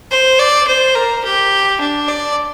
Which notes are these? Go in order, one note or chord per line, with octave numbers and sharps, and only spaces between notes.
C5
D5
C5
A#4
G4
D4
D5